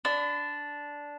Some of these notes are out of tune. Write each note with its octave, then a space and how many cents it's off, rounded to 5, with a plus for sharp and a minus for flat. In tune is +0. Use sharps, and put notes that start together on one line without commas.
D4 -10 B5 +40